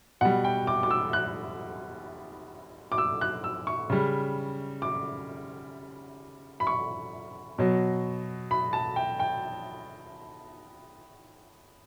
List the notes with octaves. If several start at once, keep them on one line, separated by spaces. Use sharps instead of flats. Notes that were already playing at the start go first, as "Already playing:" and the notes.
B2 G3 F#5
G5
D6
D6
E6
F#6
D6
E6
F#6
E6
C#6
C#3 G3
D6
B5
C#6
B2 F#3
B5
A5
G5
G5